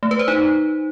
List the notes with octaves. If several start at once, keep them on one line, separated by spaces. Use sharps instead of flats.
A3
B4
C5
D#4